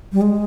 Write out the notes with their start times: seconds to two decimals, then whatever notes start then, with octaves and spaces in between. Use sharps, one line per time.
0.13 G3
0.21 G#3